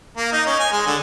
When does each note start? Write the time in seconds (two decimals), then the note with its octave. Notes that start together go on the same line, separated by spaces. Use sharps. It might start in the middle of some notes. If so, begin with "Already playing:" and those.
0.17 A#3
0.32 D#4
0.47 C#4
0.59 G#5
0.72 G#3
0.86 D3